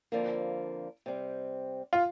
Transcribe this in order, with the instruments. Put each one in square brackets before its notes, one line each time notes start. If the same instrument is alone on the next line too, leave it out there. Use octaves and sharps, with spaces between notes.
[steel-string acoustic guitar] F2 D3 F3 A#3
C3 G3 C4
[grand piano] F4